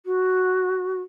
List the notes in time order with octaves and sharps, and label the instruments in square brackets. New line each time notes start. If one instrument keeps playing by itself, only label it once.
[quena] F#4